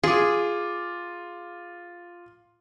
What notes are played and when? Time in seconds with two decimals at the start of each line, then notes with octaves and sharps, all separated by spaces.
0.03 F4 G#4 D6